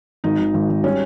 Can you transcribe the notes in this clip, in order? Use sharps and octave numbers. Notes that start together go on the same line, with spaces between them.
G#1 D#4
G#1
G#1
G#1
G3 C#4